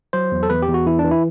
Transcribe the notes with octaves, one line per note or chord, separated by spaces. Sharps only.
F#3 C5
E2
A4
E2 B4
G4
E2
F#4
E3 E4
D4
E3
E4